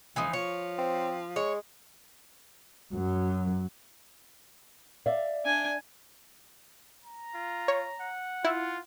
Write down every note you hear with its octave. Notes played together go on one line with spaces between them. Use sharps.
C#2 E3 F3 D#4
F3 C#5
C4
G#3 C#5
F#2 F#3
D5 E5 F5
D4 G#5
A#5
F4
C#5
F#5
E4 F4